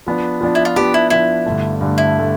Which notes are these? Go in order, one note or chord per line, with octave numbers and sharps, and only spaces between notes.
F3 B3 D4
F3 B3 D4
E4
F4
F3 B3 D4 G4
E4
F3 B3 D4 E4
G2 D3 A3
G2 D3 A3
E4
D3 A3